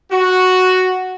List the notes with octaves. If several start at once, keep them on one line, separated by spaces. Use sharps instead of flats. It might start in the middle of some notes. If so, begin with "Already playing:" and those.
F#4